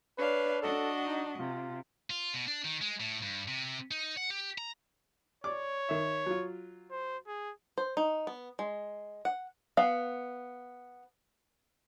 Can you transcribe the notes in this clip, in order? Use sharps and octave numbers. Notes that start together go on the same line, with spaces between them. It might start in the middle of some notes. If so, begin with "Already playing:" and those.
D4 B4 C#5 F5
D4 F#4 A4 D#5
D#4
C3 F4
F4
B2
D4
D#3
G#3
A2
G2
C3
D#4
F#5
G4
A#5
C#5 D5 D6
D#3 E5
F#3 F4
C5
G#4
C5
D#4
B3
G#3
F#5
B3 F5